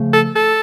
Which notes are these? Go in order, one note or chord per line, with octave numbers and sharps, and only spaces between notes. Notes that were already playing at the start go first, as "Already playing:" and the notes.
Already playing: C#3 F3 A3
A4
A4